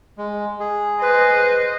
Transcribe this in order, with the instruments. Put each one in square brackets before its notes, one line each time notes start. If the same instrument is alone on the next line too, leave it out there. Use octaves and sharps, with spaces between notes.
[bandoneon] G#3
G#4
[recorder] B4 [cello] C5 D#5